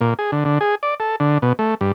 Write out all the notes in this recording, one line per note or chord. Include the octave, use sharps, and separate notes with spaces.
A#2
G#4
D3
D3
G#4
D5
A4
D3
B2
A3
G2